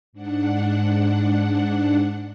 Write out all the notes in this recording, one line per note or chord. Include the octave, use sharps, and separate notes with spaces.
G#2 D4 F#5